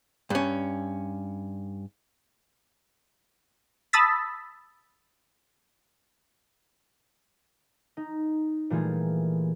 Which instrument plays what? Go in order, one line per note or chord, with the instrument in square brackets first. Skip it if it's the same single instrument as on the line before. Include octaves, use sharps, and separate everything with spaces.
[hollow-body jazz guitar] G2 C#4
[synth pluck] A5 B5 D#6 E6 A6 B6
[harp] D#4
A#2 E3 G3 A3 F4 G#4